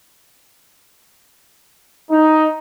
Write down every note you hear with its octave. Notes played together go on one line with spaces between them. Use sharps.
D#4